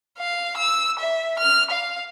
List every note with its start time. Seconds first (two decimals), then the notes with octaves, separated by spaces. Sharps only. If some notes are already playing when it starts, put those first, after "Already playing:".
0.19 F5
0.57 E6
0.99 E5
1.39 F6
1.71 F5